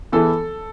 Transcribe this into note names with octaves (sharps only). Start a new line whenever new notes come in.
E3 B3 E4 G#4 A4